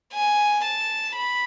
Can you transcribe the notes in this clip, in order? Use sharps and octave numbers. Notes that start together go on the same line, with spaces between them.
G#5
A5
B5